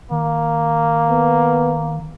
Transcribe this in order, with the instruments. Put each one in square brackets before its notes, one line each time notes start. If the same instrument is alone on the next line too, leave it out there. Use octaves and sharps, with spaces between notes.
[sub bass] D#3 [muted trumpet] A#3
[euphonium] B3